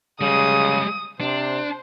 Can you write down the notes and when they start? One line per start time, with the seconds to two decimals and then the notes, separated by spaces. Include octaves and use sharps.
0.21 C#3 G3 G#3 D#6
1.21 C3 D4 C5